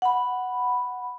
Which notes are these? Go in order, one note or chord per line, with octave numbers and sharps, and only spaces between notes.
F#5 B5